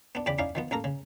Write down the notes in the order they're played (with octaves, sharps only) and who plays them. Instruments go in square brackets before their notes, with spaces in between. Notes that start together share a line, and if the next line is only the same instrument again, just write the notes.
[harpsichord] B3 D4
E2 C#3 D5 G5 B5 D6
C#4 D#4 E4 D5 F5
D#3 F3 B3
A1 A#3 A4 A#4 A#5
C#3